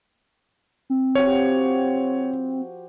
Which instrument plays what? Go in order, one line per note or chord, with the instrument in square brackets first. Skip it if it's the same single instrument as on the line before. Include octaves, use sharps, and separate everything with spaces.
[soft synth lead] C4
[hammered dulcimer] F3 F#4 G4 [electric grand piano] C#5